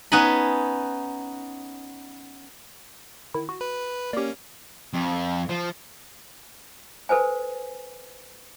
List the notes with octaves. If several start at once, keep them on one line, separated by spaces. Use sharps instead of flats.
B3 C#4 D#4 B4 G#5 B5
D#3 E4
F#4
B4
A#3 C#4 G4 D5
F2
F3
A4 B4 C5 G#5